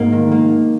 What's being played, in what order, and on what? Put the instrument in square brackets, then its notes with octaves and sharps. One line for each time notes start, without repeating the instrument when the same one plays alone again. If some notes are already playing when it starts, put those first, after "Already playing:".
Already playing: [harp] G#1 G#2 [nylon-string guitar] A#3
[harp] D#3
[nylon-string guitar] A#3